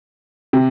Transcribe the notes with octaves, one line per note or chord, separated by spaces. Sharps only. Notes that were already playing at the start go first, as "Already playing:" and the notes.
C3